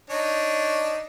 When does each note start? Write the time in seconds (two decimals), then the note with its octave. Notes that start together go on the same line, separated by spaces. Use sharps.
0.10 D4 D#4 C#5